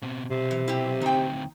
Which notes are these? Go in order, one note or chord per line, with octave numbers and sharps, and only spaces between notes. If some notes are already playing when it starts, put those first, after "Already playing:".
B2 C4
B1 C3
E3
E4 G4
D2 C4 D#4 G5